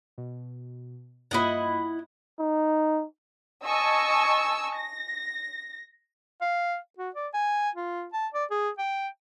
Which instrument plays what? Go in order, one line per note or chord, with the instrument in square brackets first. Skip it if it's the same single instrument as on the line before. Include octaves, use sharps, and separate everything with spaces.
[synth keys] B2
[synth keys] G2 A#3 F4 [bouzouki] E4 D#5 F#5
[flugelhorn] D#4
[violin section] D#5 G#5 A5 C#6 E6
A#6
[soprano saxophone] F5
F#4
D5
G#5
F4
A5
D5
G#4
G5